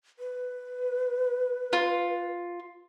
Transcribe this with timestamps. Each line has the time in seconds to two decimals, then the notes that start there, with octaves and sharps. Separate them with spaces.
0.19 B4
1.73 F4